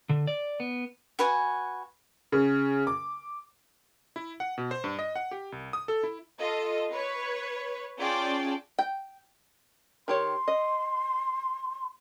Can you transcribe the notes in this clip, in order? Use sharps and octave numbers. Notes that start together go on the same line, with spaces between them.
D3
D5
B3
F#4 B4 F#5 G#5
C#3
D6
E4
F#5
B2
C5
G2
D#5
F#5
G4
C2
D#6
A4
E4
F4 A4 D#5
B4 C#5
C#4 F4 G#4 D5 G5 A5
G5
D#3 G4 C#5 C6
D#5